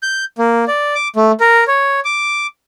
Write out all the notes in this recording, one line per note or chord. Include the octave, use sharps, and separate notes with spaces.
G6
A#3
D5
D6
A3
A#4
C#5
D6